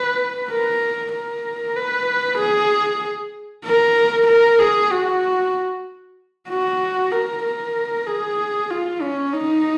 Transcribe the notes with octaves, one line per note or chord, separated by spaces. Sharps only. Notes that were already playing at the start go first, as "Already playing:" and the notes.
Already playing: B4
A#4
A#4
B4
G#4
A#4
A#4
G#4
F#4
F#4
A#4
A#4
G#4
F4
C#4
D#4